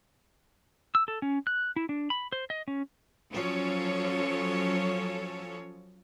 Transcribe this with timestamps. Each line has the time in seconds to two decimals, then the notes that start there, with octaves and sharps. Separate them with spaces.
0.95 E6
1.08 A4
1.22 C#4
1.47 F#6
1.76 E4
1.89 D4
2.10 B5
2.32 C5
2.50 D#5
2.68 C#4
3.31 F3 F#3 C#4 A4 C#5